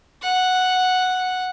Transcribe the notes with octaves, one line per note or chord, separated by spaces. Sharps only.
F#5